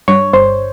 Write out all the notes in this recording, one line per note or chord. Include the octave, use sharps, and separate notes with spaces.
G2 C#5
G1 C5